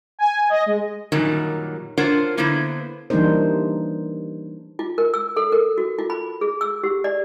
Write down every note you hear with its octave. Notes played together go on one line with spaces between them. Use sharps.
G#5
D#5
G#3
F#2 A#2 D#3 F#3 G3
D4 F4 A#4 C5 C#5 F#5
D3 A#3 B3 E4 C5
E3 G3 A#3 D4 D#4 C5
F4
A#4
E6
A4
A#4
F#4
F4
B5
G#4
E6
G4
D5